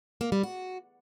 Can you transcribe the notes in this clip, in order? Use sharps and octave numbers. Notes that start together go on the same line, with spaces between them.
A#3
G3
F#4